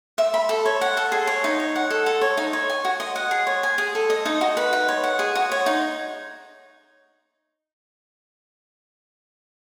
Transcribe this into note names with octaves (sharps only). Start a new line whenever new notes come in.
E5
B5
A4
C#5
F#5
A4
G#4
C#5
D#4
C#5
F#5
A4
A4
C#5
D#4
C#5
G#5
F#4
D#5
F#5
G#4
C#5
G#5
G#4
A4
D#5
D#4
F#4
B4
D#4
C#5
F#5
G#4
F#4
C#5
D#4